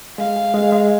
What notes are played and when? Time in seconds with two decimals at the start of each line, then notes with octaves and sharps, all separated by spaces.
0.18 G#3 F5
0.36 G#4
0.54 G#3
0.72 G#3